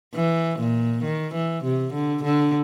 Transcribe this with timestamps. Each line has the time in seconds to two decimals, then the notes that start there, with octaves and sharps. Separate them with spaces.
0.15 E3
0.59 A#2
1.04 D#3
1.34 E3
1.64 C3
1.93 D3
2.23 D3